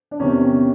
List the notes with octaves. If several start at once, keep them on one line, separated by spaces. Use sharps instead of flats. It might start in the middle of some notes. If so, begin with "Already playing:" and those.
D4
E2 C3 D#3 C#4